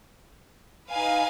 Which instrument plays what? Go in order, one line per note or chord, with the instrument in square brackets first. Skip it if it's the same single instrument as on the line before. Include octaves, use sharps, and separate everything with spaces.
[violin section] D#4 B4 F5 G#5